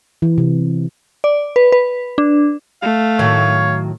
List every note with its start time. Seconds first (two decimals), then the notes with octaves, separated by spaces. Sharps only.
0.22 E3
0.38 C3
1.24 D5
1.56 B4
1.72 B4
2.18 D4
2.82 A3 F5
3.19 A2 D#3 F#3 C#5